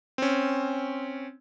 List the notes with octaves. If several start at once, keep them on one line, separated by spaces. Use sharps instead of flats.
C4 C#4